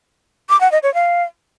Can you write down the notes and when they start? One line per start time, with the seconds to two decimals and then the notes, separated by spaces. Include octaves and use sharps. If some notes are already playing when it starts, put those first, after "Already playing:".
0.49 D6
0.61 F#5
0.72 D#5
0.83 C#5
0.94 F5